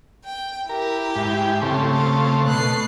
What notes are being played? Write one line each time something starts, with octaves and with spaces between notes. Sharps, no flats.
G5
E4 G4 A#4
G#2 G5
C#3 A3 C4
F5
B2 A3 F#6 C7